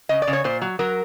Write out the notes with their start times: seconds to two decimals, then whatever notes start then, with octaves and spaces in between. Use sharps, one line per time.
0.09 C#3 D#5
0.22 D5
0.27 C#3
0.33 C#5
0.44 A#2 C5
0.62 F#3
0.79 F#3 A#4